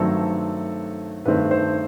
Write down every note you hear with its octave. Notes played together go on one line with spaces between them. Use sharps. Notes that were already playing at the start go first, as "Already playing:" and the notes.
Already playing: G2 D#3 F#3 A3 C4 A4
G2 D#3 A3 C4 B4
C5